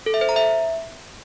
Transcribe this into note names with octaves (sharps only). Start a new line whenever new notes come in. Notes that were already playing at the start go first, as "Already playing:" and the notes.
A4
E5
C5
A#5
E5